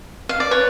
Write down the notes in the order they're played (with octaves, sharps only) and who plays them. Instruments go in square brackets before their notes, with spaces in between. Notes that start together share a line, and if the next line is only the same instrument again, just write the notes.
[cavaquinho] F5
D5
[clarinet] B4 [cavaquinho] C#5